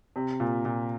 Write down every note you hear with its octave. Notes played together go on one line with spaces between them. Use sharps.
C3
A#2
A#2